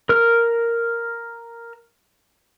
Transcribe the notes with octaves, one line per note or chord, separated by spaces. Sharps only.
A#4 F6